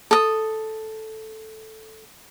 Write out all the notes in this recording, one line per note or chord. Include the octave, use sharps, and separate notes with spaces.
A4 D#6